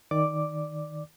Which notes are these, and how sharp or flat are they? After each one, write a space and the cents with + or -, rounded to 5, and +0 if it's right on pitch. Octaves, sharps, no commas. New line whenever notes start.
D#3 +0 D5 +0 D6 +0